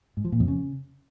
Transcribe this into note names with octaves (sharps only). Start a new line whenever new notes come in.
G#2
F3
A#2
F2
C#3